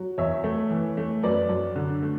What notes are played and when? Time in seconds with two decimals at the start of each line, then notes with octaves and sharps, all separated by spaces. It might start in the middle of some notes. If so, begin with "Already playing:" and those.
Already playing: F#3
0.18 E2 C#5 E5
0.44 A3
0.70 E3
0.97 A3
1.23 F#2 B4 D5
1.49 F#2
1.76 D3
2.02 A3